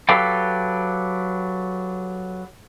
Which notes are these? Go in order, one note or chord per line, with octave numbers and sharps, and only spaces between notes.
F#3 G4 A4 B4 F5 G5